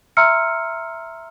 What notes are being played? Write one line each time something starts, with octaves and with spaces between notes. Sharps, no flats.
E5 A#5 C6 E6 F6 C#7